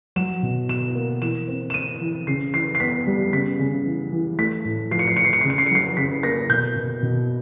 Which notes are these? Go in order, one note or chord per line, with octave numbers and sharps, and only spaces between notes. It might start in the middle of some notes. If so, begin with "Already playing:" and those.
F#3 E7
B2
B2 E7
A#3
E3 E7
C4
E7
C4 D#7
E3
C#3 C7
E3 C7
C7
B3 B6
G3
C#3 B6
C#3
E3
E3
A3 B6
A2
F3 C7
C#7
C7
F3 C#7
C7
C#7
C#3 C7
C#7
C7
C#7
F#3 C7
C#3 B6
A#3 A#6
B2 G6
B2
B2